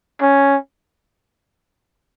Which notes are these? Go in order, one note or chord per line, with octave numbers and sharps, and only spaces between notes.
C#4